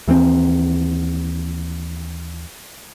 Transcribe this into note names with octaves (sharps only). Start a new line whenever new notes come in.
D#2 E3 F#3 C4